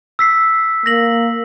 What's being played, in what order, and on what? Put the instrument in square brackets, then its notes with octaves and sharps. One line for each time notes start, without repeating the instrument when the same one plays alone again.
[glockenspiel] E6 B6 C7
[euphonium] A#3 [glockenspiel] A#6 F#7